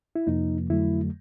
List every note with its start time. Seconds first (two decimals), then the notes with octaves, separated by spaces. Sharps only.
0.16 E4
0.27 F2 C3 F3 A#3 D#4
0.70 F2 D3 F#3 A3 E4